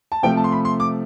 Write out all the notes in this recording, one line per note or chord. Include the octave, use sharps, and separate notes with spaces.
A5
C3 F3 A3 G5
A5
C6
B5
C6
D6